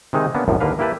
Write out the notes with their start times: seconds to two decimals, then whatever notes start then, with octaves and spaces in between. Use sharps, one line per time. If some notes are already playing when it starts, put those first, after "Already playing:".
0.13 C3 D#3 G#3 D#4
0.34 A#3 B3 C#4 D4
0.48 C2 F#2 A2
0.60 D#2 D3 A#3 B4 F5
0.79 A#3 E4 G4 B4 A5